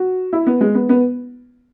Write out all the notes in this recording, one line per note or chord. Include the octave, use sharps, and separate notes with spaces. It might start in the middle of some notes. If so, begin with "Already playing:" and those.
Already playing: F#4
E4
B3
G#3
B3
B3